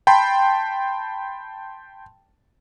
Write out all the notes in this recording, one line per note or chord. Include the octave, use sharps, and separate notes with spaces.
G5 A5 B5 C6